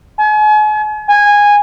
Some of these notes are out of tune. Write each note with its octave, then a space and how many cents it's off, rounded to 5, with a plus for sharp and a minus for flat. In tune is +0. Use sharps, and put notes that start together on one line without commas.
G#5 +40
G#5 -15